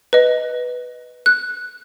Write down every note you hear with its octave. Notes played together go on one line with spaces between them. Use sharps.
B4 D#5
F#6